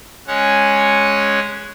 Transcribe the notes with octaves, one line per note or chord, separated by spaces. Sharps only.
G#3 C#4 C#5 F#5